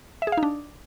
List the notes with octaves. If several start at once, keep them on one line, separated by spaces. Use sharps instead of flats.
E5
G#4
F5
D#4
D4